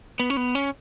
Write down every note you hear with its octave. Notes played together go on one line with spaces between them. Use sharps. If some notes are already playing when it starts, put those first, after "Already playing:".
B3
C#4
B3
C#4